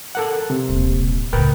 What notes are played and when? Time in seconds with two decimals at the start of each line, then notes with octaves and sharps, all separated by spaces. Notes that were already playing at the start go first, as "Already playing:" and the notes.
0.15 A4 A#4 F#5
0.50 C3
0.68 D#1 A#1
1.33 C#2 A2 A#4 B4 G5